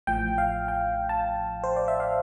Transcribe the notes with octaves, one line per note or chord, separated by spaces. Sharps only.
A1 A2 F3 G5
F5
G5
A5
C5
D5
E5
F5